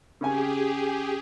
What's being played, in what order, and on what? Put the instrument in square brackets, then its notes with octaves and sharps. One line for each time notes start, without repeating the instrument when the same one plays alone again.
[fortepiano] C#3 C#4 G#5 [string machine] G4 G#4